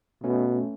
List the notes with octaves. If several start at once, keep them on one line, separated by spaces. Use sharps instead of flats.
B2 A3 C#4